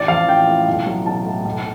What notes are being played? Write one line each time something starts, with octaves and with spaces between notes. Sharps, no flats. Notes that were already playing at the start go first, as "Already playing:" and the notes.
Already playing: A1 D5
F3 F5
A1 G5
A2
B1
F#3
B1 A5
A2
B1